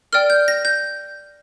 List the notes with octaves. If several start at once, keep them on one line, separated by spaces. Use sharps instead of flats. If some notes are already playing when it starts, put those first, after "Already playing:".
A#4 D5 G5 F6
G6
A#6
G6